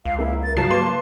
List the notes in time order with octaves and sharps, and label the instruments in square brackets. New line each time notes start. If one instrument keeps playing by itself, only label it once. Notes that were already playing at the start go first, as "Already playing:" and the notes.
[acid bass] C#2 [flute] F5
[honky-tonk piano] A#3 [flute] E4
[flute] A6
[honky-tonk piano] G2 F#3 C7 [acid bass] C#3 [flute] A5
[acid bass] A#3 [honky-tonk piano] B4 C6 D6